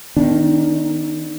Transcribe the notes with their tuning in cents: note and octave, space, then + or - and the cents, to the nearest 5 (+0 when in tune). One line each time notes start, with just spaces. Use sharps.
D#3 +0 B3 +0 D4 -25